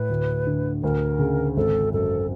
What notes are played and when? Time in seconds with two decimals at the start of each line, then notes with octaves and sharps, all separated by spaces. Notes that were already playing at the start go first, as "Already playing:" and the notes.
Already playing: A2 B4
0.10 D2
0.47 D3
0.83 D2 A#4
1.19 C#3
1.57 G#1 A4
1.93 F#2 A4